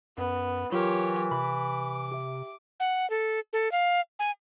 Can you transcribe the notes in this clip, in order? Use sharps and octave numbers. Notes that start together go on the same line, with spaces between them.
F#2 B3
E3 F#3 F4 G4 A#4 C#5
C3 B5 D6
G4 E5
F#5
A4
A4
F5
G#5